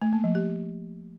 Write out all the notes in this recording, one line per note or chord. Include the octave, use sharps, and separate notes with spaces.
A3
A#3
F3
G4